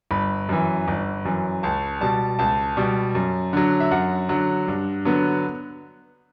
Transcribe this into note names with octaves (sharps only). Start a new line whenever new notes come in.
G1 B5
F#2 E3
G1
F#2 E3
C#2 A5
B2 G3 A5
C#2 A5
B2 G3
F#2
D3 F#3
E5
F#2 F#5
D3 F#3
G2
D3 F#3 B3